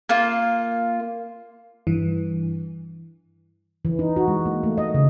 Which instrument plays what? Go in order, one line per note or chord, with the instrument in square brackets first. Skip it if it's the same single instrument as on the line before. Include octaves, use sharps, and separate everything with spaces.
[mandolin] A#3 F4
[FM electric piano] G2 E3
[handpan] E3
D#4
F#4
G#3
A#3
A3
D#5
C#3